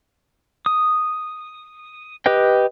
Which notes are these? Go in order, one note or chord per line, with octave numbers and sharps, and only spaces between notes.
D#6
G4 B4 D#5 G5